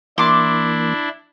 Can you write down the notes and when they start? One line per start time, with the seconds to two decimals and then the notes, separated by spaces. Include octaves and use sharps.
0.18 E3 A#3 D4 E4 C6 D6